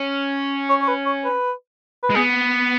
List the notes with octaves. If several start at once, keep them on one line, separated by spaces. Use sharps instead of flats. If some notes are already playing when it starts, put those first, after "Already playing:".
Already playing: C#4
C#5
C#5
B4
C#5
B4
B4
G#3
B3 G#4